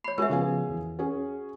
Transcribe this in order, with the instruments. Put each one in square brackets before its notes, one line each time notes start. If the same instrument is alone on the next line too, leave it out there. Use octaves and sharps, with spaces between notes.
[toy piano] C#5 B5 [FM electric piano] C7
[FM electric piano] G#3 [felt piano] F#4 G#4 [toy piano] A#4 E5
[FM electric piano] C#3 F3 B3 [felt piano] G#4 F5 G#5
[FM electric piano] E2 E3
[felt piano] C#4 G#4 [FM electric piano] F#4